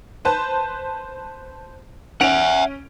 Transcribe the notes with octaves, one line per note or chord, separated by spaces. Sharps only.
B4 C5 A5
C#4 E5 F#5 D7 F7